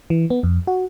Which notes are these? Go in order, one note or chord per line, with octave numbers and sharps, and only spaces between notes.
E3
B3
F2
F#4